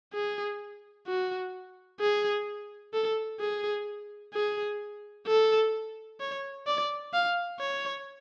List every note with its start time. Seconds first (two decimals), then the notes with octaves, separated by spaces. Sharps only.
0.14 G#4
1.07 F#4
2.01 G#4
2.93 A4
3.40 G#4
4.33 G#4
5.27 A4
6.21 C#5
6.67 D5
7.14 F5
7.60 C#5